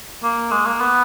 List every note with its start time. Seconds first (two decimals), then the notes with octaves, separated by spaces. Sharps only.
0.23 A#3
0.51 G#3
0.66 A#3
0.81 B3